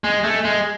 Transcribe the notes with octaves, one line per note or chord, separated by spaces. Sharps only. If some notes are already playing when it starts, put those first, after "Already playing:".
G#3
A3
G#3